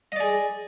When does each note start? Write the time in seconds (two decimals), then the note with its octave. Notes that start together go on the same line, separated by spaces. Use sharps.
0.12 D#5
0.16 D5
0.20 G#4